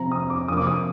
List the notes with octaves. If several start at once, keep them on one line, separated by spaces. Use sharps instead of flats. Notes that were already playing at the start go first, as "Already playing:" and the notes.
Already playing: C3 F3 C4 A#5
D#6
D6
C3 F3 A#3 D#6
D6
D#6